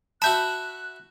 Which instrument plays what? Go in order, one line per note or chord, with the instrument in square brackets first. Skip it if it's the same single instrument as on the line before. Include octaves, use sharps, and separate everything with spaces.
[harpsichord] F#4 E5 B5 [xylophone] A5 G6 [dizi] F#6